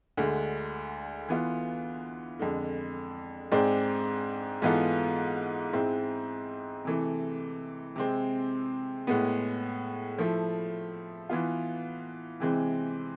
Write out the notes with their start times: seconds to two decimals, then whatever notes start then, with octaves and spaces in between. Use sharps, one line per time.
0.17 D2 D3 G#3
1.28 E3 B3 F4
2.39 F2 D3 G#3
3.52 G#2 G#3 C4 G#4 D5
4.62 G#2 E3 B3 F4 A4
5.73 G#2 G#3 C4 E4
6.85 C3 E3 A3
7.96 C3 G#3 C4
9.07 A2 G#3 B3
10.18 F3 A3 E4
11.29 E3 B3 F4
12.40 C3 E3 G#3 C4